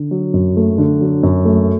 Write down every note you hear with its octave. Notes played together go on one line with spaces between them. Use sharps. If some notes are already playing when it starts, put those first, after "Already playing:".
Already playing: D3
F#3
F#2
A3
D3
F#3
F#2
A3